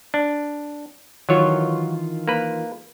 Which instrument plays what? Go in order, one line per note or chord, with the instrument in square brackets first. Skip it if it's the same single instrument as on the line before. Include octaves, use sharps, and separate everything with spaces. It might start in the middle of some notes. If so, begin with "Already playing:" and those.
[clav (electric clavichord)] D4
[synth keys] D#3 E3 F4 [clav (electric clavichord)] F#3 C#5
[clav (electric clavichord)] A#3 B4